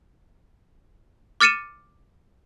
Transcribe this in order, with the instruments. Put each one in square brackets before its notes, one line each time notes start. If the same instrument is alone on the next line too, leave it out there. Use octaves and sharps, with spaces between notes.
[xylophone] D6 F6 A6 C#7 D#7 E7